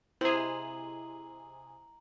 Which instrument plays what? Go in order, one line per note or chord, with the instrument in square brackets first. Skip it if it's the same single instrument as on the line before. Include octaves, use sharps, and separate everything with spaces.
[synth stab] C3 G#4 [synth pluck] E4 D#5 [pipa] C5 [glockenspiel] A#5 F#7